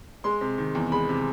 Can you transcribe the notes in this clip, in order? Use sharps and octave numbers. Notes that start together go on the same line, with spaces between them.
G#3 C6
C3
D#3
E2
G#3 B5
C3